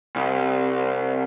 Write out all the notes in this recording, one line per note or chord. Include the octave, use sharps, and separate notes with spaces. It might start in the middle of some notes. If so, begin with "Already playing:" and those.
C2